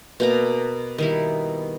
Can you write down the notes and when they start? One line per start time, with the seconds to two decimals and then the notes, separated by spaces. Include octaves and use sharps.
0.20 B2 A#3 A#5
0.98 D#3 G3 E4